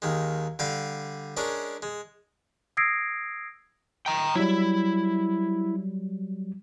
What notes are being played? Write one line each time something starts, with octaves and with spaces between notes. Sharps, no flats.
D#2 D#3 G#3
D3 G3 F5
G#3 C#4 D4 A#4
G#3
D#6 E6 G#6 A#6 C7 D7
G5 A#5
F#3 G3 E4